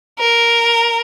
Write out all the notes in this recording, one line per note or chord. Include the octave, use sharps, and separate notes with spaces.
A#4